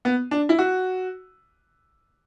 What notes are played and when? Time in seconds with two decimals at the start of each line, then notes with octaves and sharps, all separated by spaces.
0.05 B3
0.31 D4
0.49 E4
0.59 F#4